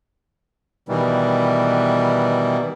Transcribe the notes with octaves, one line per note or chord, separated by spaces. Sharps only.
B2 D#3 E3 G3